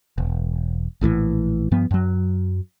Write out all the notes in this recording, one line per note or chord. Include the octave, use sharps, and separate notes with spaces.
E1
A#1 A2 D3 E3
G2 F3 B3
F#2 F#3